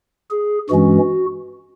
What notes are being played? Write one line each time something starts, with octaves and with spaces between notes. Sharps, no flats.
G#4
G2 E3 G#3 C#4 F#4